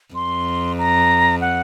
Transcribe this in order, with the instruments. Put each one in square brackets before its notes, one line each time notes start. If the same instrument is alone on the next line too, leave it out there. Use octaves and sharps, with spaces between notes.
[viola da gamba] F2 [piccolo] C6
[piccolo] A#5
F#5